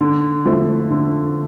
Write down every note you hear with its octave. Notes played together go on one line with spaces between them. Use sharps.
D3
F3 A3 E4
D3